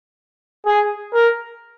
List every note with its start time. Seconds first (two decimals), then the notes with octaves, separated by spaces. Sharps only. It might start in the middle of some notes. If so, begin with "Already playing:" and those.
0.66 G#4
1.14 A#4